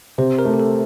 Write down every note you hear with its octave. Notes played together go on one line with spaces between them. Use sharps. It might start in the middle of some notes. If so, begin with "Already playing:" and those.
C3 C5
A#4
A3
G4
A4